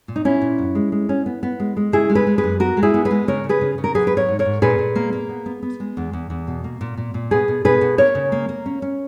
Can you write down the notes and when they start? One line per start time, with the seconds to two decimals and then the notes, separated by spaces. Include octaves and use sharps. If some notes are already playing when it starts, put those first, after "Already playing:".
0.08 A#2
0.16 D#4
0.25 A#2 C#4 E4
0.41 A#2
0.58 F#2
0.75 G#3
0.92 G#3
1.09 C#4
1.26 B3
1.43 B3
1.60 G#3
1.77 G#3
1.92 C#3 E4 G#4
2.10 G#3
2.15 G#4 B4
2.27 G#3
2.38 G#4 B4
2.43 F#2
2.60 B3 F#4 A#4
2.77 G#3
2.83 E4 G#4
2.94 B3
3.05 G#4 B4
3.11 G#3
3.28 C#3 A#4 C#5
3.44 C#3
3.49 G#4 B4
3.61 C#3
3.78 C#3
3.84 A#4
3.95 F#3 G#4 B4
4.07 B4
4.12 G#2
4.17 A#4 C#5
4.28 G#2
4.39 A#4 C#5
4.45 G#2
4.62 A#2 G#4 B4
4.78 A#2
4.96 A#3
5.13 A#3
5.29 B3
5.46 B3
5.62 B3
5.80 G#3
5.97 E2
6.13 E2
6.30 E2
6.47 B2
6.64 A#3
6.81 A#2
6.98 A#2
7.14 A#2
7.31 B2 G#4 B4
7.48 B2
7.65 B2 G#4 B4
7.81 B2
7.98 A#3 A#4 C#5
8.15 C#3
8.32 A#3
8.49 A#3
8.66 C#4
8.82 C#4